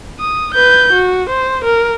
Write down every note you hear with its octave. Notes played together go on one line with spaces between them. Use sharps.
D#6
B4 G6
F#4
C5
A#4